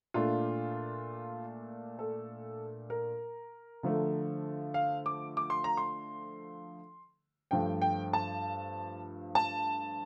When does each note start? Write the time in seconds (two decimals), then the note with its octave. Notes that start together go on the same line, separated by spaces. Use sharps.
0.14 A#2 A3 D4 F4
1.99 A4
2.90 A#4
3.83 D3 F3 A3
4.74 F5
5.06 D6
5.37 D6
5.50 C6
5.64 A#5
5.77 C6
7.51 G2 F3 A3 G5
7.82 G5
8.13 A5
9.35 A5